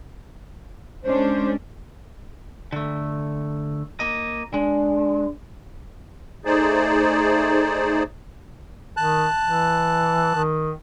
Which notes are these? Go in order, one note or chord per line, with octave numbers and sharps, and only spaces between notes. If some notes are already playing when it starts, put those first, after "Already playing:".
G#3 C#4 D4 C5
D3 A3
A#3 D#5
G#3 D4
A3 D#4 G#4 C5 D5
D#3 A5 F#6
E3
D#3